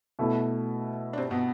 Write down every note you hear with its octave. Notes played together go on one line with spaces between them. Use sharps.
B2 A3 E4
D4
C3 C4
B2 B3